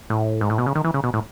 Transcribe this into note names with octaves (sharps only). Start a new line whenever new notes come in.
A2
G#2
A2
B2
C#3
D#3
E3
C#3
B2
A2